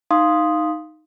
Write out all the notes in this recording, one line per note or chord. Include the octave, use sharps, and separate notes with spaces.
D#4 F5 C6 D#6